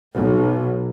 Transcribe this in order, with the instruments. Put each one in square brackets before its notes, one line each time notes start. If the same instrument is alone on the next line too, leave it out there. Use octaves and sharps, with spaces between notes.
[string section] B1